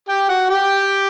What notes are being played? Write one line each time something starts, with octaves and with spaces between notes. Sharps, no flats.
G4 G5
F#4 F#5
G4 G5